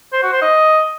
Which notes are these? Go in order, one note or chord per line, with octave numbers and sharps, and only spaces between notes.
C5
F#4
C5
D#5